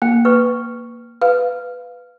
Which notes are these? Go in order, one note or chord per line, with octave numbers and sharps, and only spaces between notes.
A#3 G5
B4 C#6
B4 F5